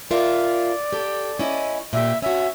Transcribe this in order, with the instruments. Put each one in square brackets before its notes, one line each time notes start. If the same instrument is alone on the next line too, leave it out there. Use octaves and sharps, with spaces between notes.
[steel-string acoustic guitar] F4 A#4 E5 [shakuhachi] D5
[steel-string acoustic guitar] G4 A4
C#4 E4 D#5
[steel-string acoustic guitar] A#2 G4 [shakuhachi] E5
[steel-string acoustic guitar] C#4 F#4 [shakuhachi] E5